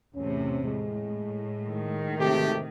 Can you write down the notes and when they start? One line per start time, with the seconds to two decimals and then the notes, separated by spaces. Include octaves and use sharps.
0.15 E2 A2 C3 C#4
0.65 A2 G#3
1.69 D#3
2.19 G#1 C3 A3 G4